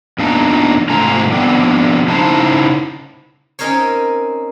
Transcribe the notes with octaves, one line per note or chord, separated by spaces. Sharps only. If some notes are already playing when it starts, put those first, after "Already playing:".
E2 A#2 D4 D#4
G#2 C3 A3 F4 G#5 A#5
F3 B3 C4 D4
C#3 D#4 E4 C5 A5
C4 C#4 D#4 A#4 C5 C#5